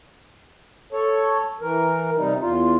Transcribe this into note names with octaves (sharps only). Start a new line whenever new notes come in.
A4 C#5
E3 A#4
C3 G3 D#4
E2 F4